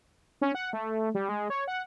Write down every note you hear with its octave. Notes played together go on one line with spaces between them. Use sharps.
C#4
F#5
A3
G3
G#3
C#5
F#5